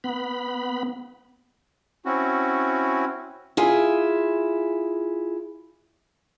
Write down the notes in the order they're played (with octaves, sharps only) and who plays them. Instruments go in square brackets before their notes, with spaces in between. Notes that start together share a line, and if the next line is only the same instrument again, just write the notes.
[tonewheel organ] B3 B5
[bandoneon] C4 C#4 E4 F#4
[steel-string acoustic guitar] E4 F4 G#4